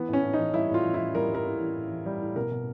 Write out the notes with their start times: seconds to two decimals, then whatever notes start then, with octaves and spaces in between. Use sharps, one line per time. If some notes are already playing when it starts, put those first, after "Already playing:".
Already playing: E3 B3
0.08 A2
0.13 C#4
0.24 A2
0.33 D#4
0.39 E3
0.54 G3 E4
0.69 A2
0.74 F4
0.84 E3
0.94 E4
0.99 E3
1.15 G3 A#4
1.30 G3 A#4
1.45 A2
1.60 E3
1.75 A2
1.90 E3
2.06 G3
2.21 A2
2.36 B2 A#4
2.51 B2